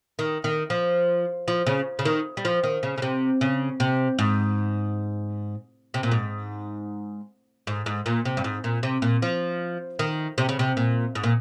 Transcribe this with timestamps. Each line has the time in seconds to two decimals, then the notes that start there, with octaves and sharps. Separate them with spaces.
0.19 D#3
0.44 D#3
0.70 F3
1.48 F3
1.67 C#3
1.99 C#3
2.05 D#3
2.37 G3
2.45 F3
2.64 D#3
2.83 C#3
2.98 C#3
3.02 C3
3.41 C#3
3.80 C3
4.19 G#2
5.94 C3
6.03 A#2
6.12 G#2
7.67 G#2
7.86 G#2
8.06 A#2
8.25 C3
8.37 G2
8.44 G#2
8.64 A#2
8.83 C3
9.02 A#2
9.22 F3
9.99 D#3
10.38 C3
10.49 C#3
10.59 C3
10.77 A#2
11.15 G#2
11.23 A#2